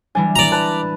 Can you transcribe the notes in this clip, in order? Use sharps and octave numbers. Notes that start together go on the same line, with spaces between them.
E3 G3 D4 G#5
D5 A#5
B4 A5 B5